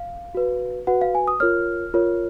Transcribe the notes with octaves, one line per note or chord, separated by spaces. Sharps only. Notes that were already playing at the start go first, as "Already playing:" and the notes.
Already playing: F5
F#4 B4
F#4 B4 F#5
F5
G#5
D#6
F4 A#4 C#5 F6
F4 A#4 C#5